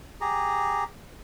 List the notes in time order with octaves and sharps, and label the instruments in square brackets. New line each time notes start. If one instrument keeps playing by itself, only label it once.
[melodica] G4 G#4 A#5